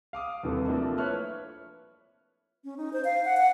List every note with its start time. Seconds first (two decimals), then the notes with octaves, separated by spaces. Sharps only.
0.13 F5 D6 D#6
0.43 D#2 C3 E3 G3 A4
0.68 F3 A3 A#3 C4 D4 E4
0.98 B4 C#5 E5 F6 F#6
2.65 C#4
2.77 D#4
2.93 C5
3.04 F5
3.25 F#5
3.37 F#5